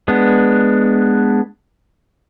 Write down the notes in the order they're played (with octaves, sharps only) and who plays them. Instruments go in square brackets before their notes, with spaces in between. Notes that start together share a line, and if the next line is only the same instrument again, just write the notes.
[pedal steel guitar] G#3 B3 D4